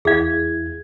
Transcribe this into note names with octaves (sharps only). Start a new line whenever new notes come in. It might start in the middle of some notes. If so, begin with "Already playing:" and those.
E2 E4 G#4 F5 G#6